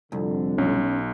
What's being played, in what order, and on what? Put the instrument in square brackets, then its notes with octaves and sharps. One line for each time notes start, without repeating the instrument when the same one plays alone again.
[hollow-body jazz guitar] C2 [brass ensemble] F2 D3
[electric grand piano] B1 [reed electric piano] C#4